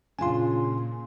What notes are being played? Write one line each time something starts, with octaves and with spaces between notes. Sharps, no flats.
A#2 C#3 D4 F4 G#5 C6